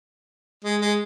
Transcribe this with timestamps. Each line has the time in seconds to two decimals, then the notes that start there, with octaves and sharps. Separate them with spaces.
0.64 G#3
0.81 G#3